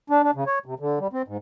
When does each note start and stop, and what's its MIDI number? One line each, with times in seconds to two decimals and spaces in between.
0.10 0.22 62
0.24 0.31 62
0.35 0.44 49
0.47 0.59 73
0.66 0.74 48
0.80 0.99 50
0.99 1.07 55
1.13 1.22 60
1.28 1.37 44